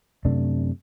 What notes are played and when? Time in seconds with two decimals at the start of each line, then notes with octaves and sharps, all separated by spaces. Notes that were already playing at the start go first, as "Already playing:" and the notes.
0.25 F#2 C3 A3 D4